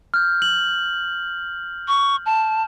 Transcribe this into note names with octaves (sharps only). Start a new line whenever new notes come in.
F6 G6
F#7
C#6
A5